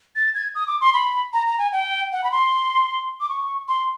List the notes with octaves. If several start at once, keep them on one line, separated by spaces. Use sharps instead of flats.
A6
G#6
D#6
D6
C6
B5
A#5
A#5
G#5
G5
F#5
B5
C6
D6
C#6
C6